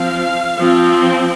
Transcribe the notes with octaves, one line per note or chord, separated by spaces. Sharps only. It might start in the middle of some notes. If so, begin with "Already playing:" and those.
Already playing: F3 C4 F5
F3 C4